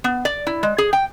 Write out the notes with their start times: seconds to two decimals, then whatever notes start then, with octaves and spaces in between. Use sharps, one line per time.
0.04 B3
0.25 D5
0.47 E4
0.63 G#3
0.78 G#4
0.93 G5